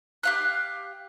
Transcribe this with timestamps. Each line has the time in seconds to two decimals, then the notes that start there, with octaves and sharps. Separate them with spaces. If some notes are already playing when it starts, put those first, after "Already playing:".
0.23 G4 F5 F#6